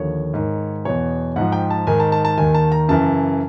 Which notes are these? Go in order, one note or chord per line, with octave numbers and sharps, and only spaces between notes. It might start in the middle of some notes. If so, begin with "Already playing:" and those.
Already playing: D#2 D3 F3 C#5
G#2 D#3
E2 B2 C#5
G#2 F3 F#5
G5
A5
G#2 D#3 G#5
A5
A5
A5
D#2 D#3 G#5
A5
A#5
F#2 C#3 E3 A5